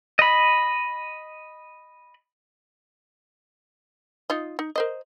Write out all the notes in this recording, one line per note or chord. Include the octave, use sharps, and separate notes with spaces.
D#5 B5
D#4 F4 D#5
D#4
A#4 C5 D#5